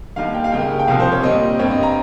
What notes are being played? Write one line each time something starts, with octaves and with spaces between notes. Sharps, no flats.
D#2 D#3 G3 F5
G5
F5
C#2 C#3 G3 A#3 G5
G5
C2 C3 F3 F5
C5
C#5
A#2 G3 C4 D#5
G2 G3 C4 C#5
D#5
A#5